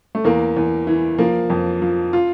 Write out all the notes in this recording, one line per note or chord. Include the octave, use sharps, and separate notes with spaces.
A3
E2 A#3
E2
E3
F3 A#3
F2
F3
F4